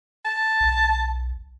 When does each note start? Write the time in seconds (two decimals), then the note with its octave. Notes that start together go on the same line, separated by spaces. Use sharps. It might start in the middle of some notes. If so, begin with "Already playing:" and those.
0.25 A5
0.61 B1